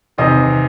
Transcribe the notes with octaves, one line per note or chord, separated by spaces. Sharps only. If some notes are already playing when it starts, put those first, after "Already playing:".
E2 C3 D#3 D#5